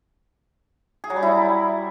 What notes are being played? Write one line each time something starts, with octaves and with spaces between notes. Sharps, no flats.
G#4
F#3
G3
E4